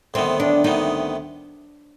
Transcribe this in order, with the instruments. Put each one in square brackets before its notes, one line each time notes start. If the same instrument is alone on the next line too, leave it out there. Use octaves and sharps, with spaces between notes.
[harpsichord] D2 C3 D#3 B3 [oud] C4
[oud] D4
[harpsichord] D2 C3 D#3 B3 [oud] D#4